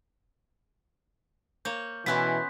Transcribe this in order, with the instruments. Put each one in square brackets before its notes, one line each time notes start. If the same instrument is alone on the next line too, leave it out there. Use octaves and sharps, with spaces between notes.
[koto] A#3 C#5 [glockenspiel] G6
[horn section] B2 E3 [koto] B3 C#4 E4 [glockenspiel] C6 F#6 B6